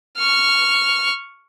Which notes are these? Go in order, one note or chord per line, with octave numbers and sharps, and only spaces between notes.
C#6 F6